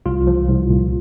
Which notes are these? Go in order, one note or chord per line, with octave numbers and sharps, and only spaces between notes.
C2 F4
F3
C2
A#2